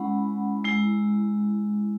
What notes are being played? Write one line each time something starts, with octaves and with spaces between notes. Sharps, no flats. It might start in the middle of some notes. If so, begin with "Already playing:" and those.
Already playing: G#3 C#4 E4 F#5 B5
G#3 E4